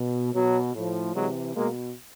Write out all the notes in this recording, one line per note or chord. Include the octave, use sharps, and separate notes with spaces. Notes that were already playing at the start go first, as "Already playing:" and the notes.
Already playing: B2
B2 F#3
A2 F3
C3 E3 F#3 G#3
B2 G#3 A#3